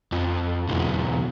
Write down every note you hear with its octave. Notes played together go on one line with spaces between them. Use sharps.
F2
B1 E2